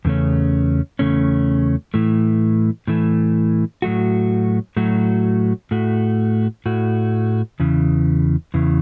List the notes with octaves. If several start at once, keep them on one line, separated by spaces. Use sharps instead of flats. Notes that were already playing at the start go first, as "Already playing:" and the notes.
E2 C#3 A3 C#4
E2 C#3 A3 C#4
A2 E3 A3
A2 E3 A3
A2 F#3 A3 F#4
A2 F#3 A3 F#4
A2 A3 F#4
A2 A3 F#4
E2 C#3 E3
E2 C#3 E3